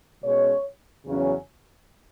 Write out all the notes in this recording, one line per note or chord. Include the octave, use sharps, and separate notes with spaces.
B2 G#3 C#4 C#5
E2 C#3 F#3 C#4